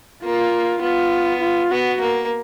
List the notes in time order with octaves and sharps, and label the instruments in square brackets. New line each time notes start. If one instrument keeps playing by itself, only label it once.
[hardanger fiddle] A#3 [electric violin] F4
[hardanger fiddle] B3 [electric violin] F4
[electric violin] F4
[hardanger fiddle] B3 [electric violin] F#4
[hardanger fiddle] A#3